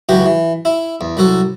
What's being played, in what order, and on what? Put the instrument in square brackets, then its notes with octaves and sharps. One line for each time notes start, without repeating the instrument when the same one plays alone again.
[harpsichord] C#2 E3 F#3 F#4 G4
E3
E4
E2
C2 F#3 F#4 A4